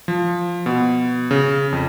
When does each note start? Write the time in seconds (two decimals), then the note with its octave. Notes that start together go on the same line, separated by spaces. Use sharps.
0.08 F3
0.66 B2
1.31 C#3
1.72 F2